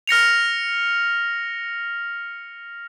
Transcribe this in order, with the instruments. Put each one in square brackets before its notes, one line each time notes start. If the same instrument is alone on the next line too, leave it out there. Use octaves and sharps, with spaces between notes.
[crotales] F6 A#6 C#7 F7